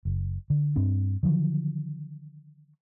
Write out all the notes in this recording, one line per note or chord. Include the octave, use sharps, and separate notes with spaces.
F#1
D3
G2 C4 D4
D3 D#3 F3 F#3